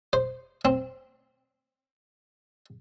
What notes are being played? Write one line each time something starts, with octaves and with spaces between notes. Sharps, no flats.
C5
C4